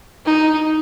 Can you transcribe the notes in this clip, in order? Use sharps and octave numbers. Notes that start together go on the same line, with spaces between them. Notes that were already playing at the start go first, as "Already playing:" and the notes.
D#4